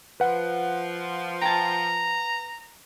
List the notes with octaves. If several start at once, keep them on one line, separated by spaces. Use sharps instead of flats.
F3 B4 F#5
G5 A5 A#5